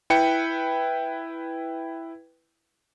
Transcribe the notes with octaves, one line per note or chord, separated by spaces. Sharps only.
E4 B4 G5 C#7